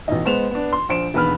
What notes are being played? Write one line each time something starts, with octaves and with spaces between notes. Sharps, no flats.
A1 B2 D#4
G#3 B3 C5 E7 F7
B3 D4
C6
A#1 C5 D7 E7
E1 D#2 B3 B4 B5 F6